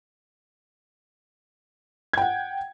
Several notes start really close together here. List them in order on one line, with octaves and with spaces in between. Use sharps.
G#6 G5 F#5